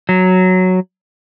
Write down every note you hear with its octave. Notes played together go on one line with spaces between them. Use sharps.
F#3